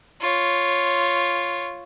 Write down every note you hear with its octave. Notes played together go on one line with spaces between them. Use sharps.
F4 C#5